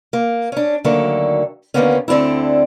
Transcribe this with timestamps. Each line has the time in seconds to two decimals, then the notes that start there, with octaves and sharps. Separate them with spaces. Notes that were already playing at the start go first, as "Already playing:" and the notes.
0.13 A#3
0.52 C#4 D4
0.84 D2 D3 D#3 F#3 A#3 A4
1.74 D#2 B2 D3 A#3 B3 C#4
2.08 D2 D3 C4 D4 E4